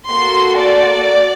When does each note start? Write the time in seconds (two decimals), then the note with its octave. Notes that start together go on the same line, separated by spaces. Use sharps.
0.10 A#3 F#4 A4 C6
0.59 D5